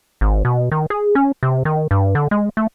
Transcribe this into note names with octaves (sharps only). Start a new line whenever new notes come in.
G#1
B2
D#3
G#4
C#4
C3
D#3
G2
D3
G#3
A3